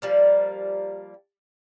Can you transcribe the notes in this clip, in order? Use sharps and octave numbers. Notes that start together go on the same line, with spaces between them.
F3 G3 A#3